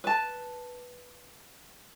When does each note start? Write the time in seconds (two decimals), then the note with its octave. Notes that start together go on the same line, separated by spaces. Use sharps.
0.04 B4 A5